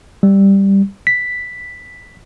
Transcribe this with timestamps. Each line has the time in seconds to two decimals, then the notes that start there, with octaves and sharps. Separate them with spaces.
0.23 G3
1.07 B6